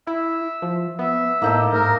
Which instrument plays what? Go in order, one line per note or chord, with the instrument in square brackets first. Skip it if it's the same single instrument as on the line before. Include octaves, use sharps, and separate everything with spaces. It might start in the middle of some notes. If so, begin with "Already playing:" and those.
[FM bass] E4 [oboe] E5
[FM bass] F3
[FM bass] B3 [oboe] E5
[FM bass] A2 [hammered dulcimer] A#3 D#4 A4
[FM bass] G#2 [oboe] A#4